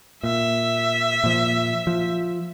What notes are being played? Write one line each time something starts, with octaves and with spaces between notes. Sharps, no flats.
A#2 E5
A#2 F3
F3